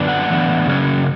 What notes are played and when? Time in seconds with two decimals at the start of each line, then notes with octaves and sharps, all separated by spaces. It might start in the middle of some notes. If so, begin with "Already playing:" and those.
Already playing: F#2 D3 B3 D4
0.08 F#5
0.28 A2 E3 B3 D4
0.67 C#3 F#3 C#4